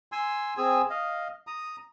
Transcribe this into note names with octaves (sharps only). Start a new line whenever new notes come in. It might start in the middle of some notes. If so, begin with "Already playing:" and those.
G#5 C6 E6
C4 G#4 G#5 E6
D#5 F5
A#5 D#6